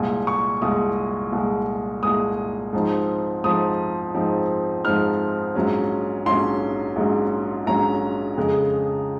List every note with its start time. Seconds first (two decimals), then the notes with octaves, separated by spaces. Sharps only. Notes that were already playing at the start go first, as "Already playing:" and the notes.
Already playing: C2 A#2 G#3
0.27 C#6
0.62 C2 A#2 G#3 D#6
1.33 C2 A#2 G#3
2.03 C2 A#2 G#3 D#6
2.73 G#2 F3 C4 D#4
3.44 G#2 F3 C4 D#4 D#6
4.14 G#2 F3 C4 D#4
4.85 G#2 F3 C4 D#4 F6
5.55 A#1 G#2 F#3 C#4
6.26 A#1 G#2 F#3 C#4 C6
6.96 A#1 G#2 F#3 C#4
7.67 A#1 G#2 F#3 C#4 A#5
8.37 F2 C#3 G#3